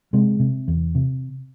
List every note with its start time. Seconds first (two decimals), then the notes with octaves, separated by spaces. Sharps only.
0.13 C3 G#3
0.40 C3
0.68 E2
0.95 C3